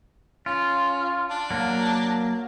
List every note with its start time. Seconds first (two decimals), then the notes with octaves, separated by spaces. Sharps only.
0.46 C#4 F4
1.30 D4
1.51 F#3 A#3